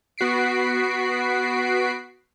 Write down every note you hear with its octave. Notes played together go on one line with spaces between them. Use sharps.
B3 F#4 B6 C7 D7